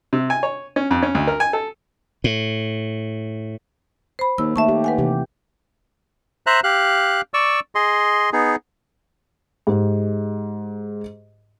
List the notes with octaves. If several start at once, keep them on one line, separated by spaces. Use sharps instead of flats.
C3
G#5
C#5
C#4
F2
C#4
D2
A#4
G#5
A4
A2
C5 B5
D#2 A#3 E6
D#2 A3 E5 A5 C#6
G4
B4 F#5 G#5
C3 E3 G4
C5 E5 A#5 F#6
G4 F5 F#6
D5 C#6 E6
G#4 D#5 C6
B3 D#4 G#4
G#2 G4 G#4